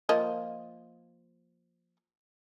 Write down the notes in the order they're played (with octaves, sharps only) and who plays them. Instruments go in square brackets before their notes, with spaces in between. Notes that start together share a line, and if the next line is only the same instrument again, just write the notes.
[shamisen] F3 A#3 D#5